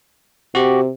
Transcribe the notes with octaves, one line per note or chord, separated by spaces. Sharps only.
C3 F#4 G4